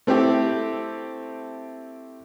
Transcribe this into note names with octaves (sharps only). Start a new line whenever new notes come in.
A3 C4 E4 G4 A4